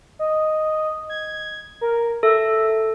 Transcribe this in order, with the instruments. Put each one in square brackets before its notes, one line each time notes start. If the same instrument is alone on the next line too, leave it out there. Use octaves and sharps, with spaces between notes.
[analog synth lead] D#5
G#6
A#4
[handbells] A4 [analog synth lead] E5